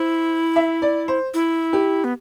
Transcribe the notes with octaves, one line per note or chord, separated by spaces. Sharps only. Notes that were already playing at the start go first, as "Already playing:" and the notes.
Already playing: E4 C5
E5
D5
C5
E4
G4
B3